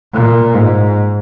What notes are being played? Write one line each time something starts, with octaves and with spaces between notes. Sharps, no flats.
A#2
G#2